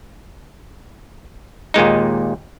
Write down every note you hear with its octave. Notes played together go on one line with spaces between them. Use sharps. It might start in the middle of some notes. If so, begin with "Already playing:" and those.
D#2 A#2 G#3 D#4